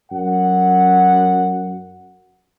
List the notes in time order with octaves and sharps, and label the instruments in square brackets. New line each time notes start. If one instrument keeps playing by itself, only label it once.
[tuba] F#2 [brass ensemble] F#5